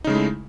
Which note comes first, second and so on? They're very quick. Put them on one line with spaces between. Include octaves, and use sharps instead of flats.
D#4 C#3 G#3 A3 E4